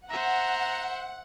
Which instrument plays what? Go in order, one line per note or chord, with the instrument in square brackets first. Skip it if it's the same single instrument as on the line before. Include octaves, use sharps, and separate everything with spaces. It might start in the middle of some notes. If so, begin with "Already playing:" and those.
[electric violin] C5 E5 [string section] F#5 [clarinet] A#5